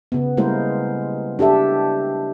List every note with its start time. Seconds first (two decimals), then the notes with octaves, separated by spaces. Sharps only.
0.12 C#3 B3
0.37 G3 G#3 A#3 E4 A#4 C5
1.39 D4 G4 A4 E5